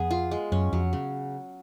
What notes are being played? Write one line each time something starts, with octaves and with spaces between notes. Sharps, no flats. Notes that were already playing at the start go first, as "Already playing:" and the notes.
Already playing: F2 B3 G#4
F4
G#3
F#2 C#4
F2 F#3
C#3